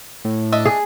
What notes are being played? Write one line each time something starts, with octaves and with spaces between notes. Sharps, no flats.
A2
D4 D#5 E5
G#4